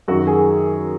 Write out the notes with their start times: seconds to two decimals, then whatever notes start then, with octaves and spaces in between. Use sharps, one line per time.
0.08 F#2 F#4
0.11 D#3
0.27 G#4